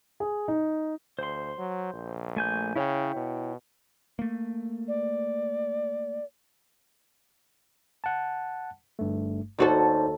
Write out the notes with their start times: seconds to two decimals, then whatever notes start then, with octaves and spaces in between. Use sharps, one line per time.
0.20 G#4
0.48 D#4
1.19 D2 C5 C6
1.58 F#3
1.93 A#1
2.36 A3 G#5 G6
2.75 C#3 E4 C#5 G5
3.16 B2
4.19 A3 A#3
4.88 D5
8.04 F#5 A5
8.99 G1 G2 A3
9.59 D#2 D#4 F#4 A4 C5 D5